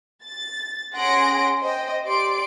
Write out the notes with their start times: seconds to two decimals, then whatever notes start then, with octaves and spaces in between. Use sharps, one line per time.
0.23 A6
0.94 C#4 G#4 F#5 C6 A#6 D7
1.60 C5 D#5 G5
2.04 G4 D5 C6 D7